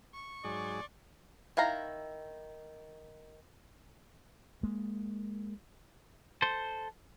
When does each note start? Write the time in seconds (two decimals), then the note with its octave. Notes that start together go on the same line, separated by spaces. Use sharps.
0.14 C#6
0.44 G#2 F#3 G#4 D5
1.57 D#3 E4 F5 A#5
4.63 G#3 A#3
6.42 A4 C5